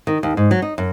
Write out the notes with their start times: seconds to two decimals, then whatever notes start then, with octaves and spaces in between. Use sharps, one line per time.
0.07 D#3
0.23 D#2
0.37 G#2
0.51 F#3
0.62 D#4
0.78 F#2